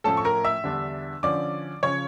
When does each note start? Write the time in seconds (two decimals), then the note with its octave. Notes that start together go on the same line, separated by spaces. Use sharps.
0.04 A2 F3 A3 C#4 A4 A5
0.17 C#6
0.25 A#4 A#5
0.44 E5 E6
0.64 E2 D3 G3 D4
1.23 D3 F3 C#4 D5 D6
1.83 C#3 F3 C#4 C#5 C#6